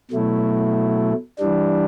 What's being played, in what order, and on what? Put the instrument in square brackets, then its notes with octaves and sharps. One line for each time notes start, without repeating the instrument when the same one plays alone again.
[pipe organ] B2 F#3 A3 E4
E3 G3 D4